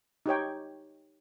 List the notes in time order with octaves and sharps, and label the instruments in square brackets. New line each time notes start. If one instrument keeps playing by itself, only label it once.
[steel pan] D#4 G4 C#5 G5